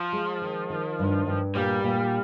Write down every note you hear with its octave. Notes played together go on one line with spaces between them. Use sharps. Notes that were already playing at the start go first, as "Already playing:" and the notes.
Already playing: F3
G#3
D#3
D#3
G2
G2
A#2 G3
A#2